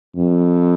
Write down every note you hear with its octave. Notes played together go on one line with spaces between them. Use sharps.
F2